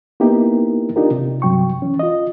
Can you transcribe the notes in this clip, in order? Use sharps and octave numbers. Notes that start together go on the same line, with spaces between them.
A#3 B3 D#4 E4 G4 A#4
D4 D#4 F4 G4 A#4
C3
G2 C3 F#3 G5 C#6
E3 C#4
F4 D#5